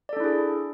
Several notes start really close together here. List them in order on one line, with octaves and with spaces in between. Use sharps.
D5 A4 D4 E4 G#4